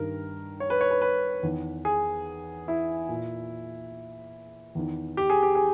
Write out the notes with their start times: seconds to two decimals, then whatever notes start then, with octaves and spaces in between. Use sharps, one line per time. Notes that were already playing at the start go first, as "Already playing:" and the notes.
Already playing: G2 D#3 A#4
0.60 C#5
0.70 B4
0.81 C#5
0.91 B4
1.02 B4
1.43 E2 D#3
1.85 G#4
2.68 E4
3.09 A#2
4.75 E2 D#3
5.17 G4
5.30 G#4
5.43 G4
5.55 G#4